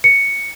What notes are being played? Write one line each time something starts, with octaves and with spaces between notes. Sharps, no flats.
C#7